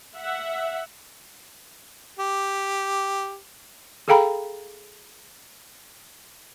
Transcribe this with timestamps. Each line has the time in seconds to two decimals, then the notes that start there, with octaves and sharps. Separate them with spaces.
0.16 E5 F#5
2.19 G4
4.08 G#4 A4 F5 G5 A#5 B5